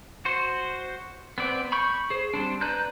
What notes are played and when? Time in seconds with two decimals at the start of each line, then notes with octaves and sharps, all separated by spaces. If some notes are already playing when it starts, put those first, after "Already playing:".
0.25 F#4 C5
1.38 B3 C4 D5
1.72 B5 C#6 G6
2.10 G#4 C5
2.34 G3 C4 D4
2.61 B4 D5 A#5 F#6 G6